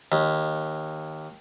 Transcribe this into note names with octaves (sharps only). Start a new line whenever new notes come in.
D#2